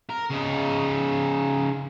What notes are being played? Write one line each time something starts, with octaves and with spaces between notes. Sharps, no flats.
A#4
C#3 D#4